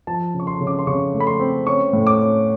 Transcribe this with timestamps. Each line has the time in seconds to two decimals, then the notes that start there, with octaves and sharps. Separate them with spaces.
0.07 F3 A5
0.34 C#3
0.40 C#6
0.47 C6
0.61 C#3
0.67 D6
0.79 C6
0.87 C#3 C#6
1.14 A3
1.20 B5
1.27 C6
1.40 C4
1.67 C#4 C#6
1.93 A2
2.07 D6
2.20 C#4